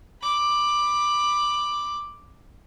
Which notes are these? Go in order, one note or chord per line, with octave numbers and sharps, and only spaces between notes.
B5 D6